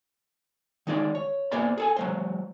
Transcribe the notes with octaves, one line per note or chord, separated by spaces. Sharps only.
D#3 G#3 D#4 G#4 D5
C#5
A#3 B3 G#4 C5 D5 B5
G#4 A4 G#5
F#3 G#3 C5